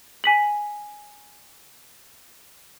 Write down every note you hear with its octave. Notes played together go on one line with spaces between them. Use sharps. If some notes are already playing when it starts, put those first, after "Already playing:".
G#5 B6 F#7